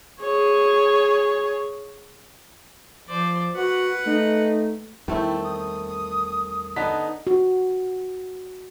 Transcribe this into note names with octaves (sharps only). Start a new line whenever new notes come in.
G#4 C#5
F3 C5 D5
F#4 B4 F#5
A3 D#4
E2 D#3 G3 A3 C4 E4
D#6
D3 B3 D#4 A5 B6
F#4